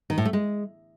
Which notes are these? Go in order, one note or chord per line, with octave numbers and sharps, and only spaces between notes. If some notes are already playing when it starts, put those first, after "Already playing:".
D#3
A2
A3
G#3